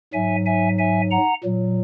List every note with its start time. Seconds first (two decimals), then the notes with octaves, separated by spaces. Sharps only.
0.13 G#2 F#3 E5 G#5
0.46 E5 G#5
0.78 E5 G#5
1.11 F#5 A#5
1.44 A#2 F#3